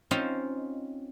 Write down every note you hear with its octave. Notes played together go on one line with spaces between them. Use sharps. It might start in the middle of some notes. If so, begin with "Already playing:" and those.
C4 C#4 D#4 F4 C5 D#5